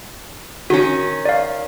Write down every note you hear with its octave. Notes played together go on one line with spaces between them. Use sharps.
D#3 C#4 F#4
D5 F5